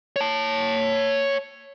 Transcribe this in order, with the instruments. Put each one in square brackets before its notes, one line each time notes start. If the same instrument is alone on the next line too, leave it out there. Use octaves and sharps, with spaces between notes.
[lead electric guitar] C#5 A5